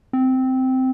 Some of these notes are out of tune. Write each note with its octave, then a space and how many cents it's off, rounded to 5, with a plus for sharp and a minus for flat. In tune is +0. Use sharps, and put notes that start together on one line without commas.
C4 -10